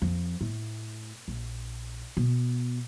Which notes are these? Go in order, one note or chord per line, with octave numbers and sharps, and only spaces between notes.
F2
A2
A#1
B2